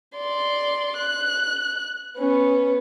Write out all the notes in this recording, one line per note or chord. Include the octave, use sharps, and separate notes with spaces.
D5 C6
F#6
B3 C#4